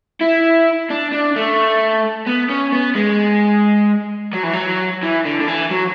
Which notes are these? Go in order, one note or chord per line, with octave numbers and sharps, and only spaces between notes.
E4
D4
D4
A3
B3
C#4
B3
G#3
F#3
E3
F#3
E3
D3
D3
E3
F#3